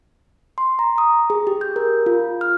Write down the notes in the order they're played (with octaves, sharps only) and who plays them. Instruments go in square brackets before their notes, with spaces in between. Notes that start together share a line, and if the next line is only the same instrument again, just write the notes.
[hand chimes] C6
A#5
D#6
G#4
G4
G6
A#4
F4
F6